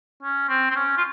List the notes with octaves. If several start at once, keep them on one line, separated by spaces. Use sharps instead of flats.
C#4
C4
C4
C#4
F4